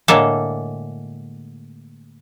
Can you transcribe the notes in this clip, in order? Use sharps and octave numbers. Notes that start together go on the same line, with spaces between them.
A2 D3 G#3 A#3 A4